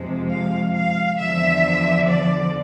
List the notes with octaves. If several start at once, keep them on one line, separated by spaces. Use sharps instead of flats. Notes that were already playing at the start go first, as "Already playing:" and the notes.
Already playing: F2 C3 G#3
F5
F5
E2 D3 F3 E5
D5